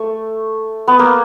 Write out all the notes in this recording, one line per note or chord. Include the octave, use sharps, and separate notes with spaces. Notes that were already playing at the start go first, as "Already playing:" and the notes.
Already playing: A3
B3
A#3